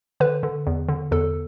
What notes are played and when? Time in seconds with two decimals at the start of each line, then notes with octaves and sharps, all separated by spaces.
0.20 D3 B4
0.43 D3
0.67 E2
0.89 D3
1.11 E2 A4